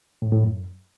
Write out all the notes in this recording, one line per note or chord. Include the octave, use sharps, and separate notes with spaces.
A2
A2
F#2